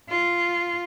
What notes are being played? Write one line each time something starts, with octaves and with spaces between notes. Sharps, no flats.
F4